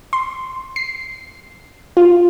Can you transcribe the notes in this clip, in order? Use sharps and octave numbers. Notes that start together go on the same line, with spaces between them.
C6
C7
F4